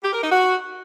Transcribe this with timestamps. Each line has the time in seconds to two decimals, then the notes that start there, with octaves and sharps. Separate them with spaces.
0.03 G4
0.12 A#4
0.22 D#4
0.31 F#4